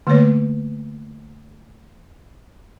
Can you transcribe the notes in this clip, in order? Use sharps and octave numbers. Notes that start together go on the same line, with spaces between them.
D3 A3 A#3 B4 C#5